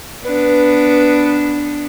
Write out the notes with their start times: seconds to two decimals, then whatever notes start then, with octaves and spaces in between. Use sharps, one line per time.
0.24 B3 D4 B4